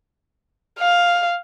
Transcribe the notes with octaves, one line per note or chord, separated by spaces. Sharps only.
F5